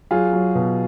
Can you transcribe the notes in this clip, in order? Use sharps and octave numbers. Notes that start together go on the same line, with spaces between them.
F#3 F4 G#4
F#3
B2